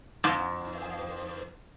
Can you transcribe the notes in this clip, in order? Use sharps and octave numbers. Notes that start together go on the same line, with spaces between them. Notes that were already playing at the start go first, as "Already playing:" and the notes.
F2 G#2